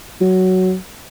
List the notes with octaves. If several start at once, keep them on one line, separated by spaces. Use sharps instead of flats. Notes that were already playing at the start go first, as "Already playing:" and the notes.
F#3